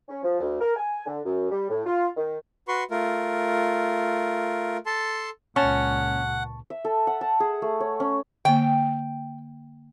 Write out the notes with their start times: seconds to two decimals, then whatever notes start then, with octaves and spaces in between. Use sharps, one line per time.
0.09 C#4
0.24 F3
0.40 D2
0.60 A#4
0.76 G#5
1.06 D3
1.25 F#2
1.51 G3
1.70 A2
1.86 F4
2.17 D#3
2.68 F#4 B4 C6 C#6
2.91 A3 F4 A#4
4.86 A4 A5 C6
5.56 C#2 A#2 C#4 F#5 A5 C#6
6.70 E5
6.85 A4
7.07 F#5
7.21 A5
7.40 G#4
7.62 A3
7.80 C#5
8.00 C#4
8.45 D3 A#3 G5